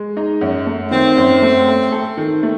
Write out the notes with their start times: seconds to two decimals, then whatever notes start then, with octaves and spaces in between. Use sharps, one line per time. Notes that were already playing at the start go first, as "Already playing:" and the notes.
Already playing: G#3
0.17 D#4
0.41 F#2
0.66 A3
0.91 D#3 C4
1.17 F#2
1.42 A3
1.67 A3
1.92 A4
2.17 D#3
2.43 A3